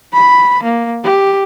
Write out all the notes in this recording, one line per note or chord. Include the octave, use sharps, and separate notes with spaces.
B5
A#3
G4